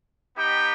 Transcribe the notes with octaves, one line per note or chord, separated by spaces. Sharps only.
B3 D#4 G4 G5